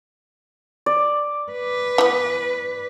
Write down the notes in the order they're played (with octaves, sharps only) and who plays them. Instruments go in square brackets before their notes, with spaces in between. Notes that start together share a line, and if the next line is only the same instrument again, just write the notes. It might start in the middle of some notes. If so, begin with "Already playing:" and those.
[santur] D5
[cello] B4
[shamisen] E3 B3